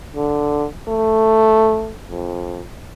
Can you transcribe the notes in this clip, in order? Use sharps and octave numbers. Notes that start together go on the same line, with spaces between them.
D3
A3
F2